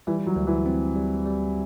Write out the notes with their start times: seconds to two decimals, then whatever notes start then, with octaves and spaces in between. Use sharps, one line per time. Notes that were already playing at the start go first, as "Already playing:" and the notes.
0.07 E3 G3
0.26 F#3
0.36 D2
0.47 E3
0.66 C4
0.96 G3
1.26 G3